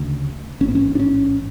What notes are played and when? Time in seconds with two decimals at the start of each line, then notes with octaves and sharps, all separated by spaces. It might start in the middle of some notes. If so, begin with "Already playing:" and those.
Already playing: D2 C#3
0.61 A1 G#2 C#4
0.68 B3
0.75 C#4
0.95 D4
1.00 C#4